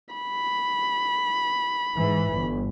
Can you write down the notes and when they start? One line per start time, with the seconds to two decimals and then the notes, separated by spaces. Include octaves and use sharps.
0.15 B5
1.96 G#2 E3
2.31 G1